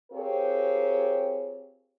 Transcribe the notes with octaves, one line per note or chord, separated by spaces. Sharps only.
C4 F4 G4 G#4 A#4 C#5